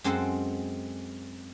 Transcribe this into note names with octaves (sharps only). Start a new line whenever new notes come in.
F#2 G#3 C4 A4 F#5